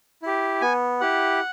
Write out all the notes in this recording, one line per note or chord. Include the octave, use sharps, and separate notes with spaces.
E4 G4
B3 G#5
E4 G4 F#5